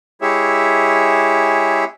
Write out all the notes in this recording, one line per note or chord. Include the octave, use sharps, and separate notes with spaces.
G#3 E4 G4 G#4 C#5 E5